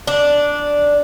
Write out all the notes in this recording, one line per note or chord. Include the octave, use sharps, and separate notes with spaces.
D4